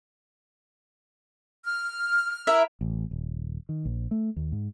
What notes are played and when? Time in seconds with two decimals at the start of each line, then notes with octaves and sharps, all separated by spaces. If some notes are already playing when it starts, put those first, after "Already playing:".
1.65 F6
2.47 E4 A#4 E5
2.81 A1
3.11 D#1
3.69 D#3
3.85 A#1
4.11 A3
4.36 D#2
4.52 G#2